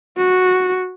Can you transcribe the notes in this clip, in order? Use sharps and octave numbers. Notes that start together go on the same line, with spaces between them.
F#4